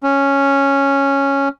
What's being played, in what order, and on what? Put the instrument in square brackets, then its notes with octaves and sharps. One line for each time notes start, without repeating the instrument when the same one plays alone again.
[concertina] C#4